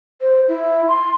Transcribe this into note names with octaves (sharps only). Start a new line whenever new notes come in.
C5
E4
C6